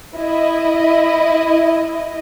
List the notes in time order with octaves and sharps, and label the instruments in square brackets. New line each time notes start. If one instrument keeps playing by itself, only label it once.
[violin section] E4 D#5